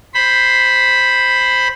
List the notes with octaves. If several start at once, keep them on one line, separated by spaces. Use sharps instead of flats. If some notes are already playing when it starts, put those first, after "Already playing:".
C5 B5